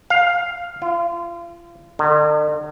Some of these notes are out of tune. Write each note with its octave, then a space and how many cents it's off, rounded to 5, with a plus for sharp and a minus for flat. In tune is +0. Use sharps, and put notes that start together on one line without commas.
F5 +5
F4 -35
D3 +45